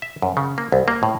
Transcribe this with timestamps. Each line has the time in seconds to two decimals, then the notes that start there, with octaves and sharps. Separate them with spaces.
0.02 E5
0.22 F#2
0.37 C#3
0.58 A#3
0.72 C2
0.88 A#3
1.03 A2